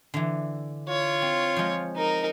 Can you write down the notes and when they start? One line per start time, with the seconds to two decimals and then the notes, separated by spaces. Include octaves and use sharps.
0.14 D3 E3
0.89 F4 C#5
1.22 C4
1.56 F3 G#3
1.97 D#4 A#4